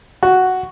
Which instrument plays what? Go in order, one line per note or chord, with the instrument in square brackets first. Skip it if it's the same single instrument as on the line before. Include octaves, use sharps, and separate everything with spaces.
[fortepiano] F#4